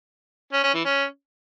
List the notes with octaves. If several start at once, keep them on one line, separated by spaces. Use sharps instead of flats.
C#4
C#4
E3
C#4